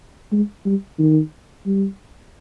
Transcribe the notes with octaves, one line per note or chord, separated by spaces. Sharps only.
G#3
G3
D#3
G3